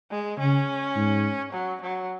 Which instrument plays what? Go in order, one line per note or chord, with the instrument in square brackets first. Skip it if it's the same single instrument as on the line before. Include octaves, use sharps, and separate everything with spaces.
[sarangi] G#3
[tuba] C#3 [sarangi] C#4
[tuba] G#2
[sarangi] F#3
F#3